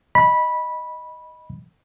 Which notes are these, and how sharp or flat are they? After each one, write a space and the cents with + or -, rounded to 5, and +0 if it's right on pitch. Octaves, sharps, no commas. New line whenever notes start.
D#5 +0 B5 -10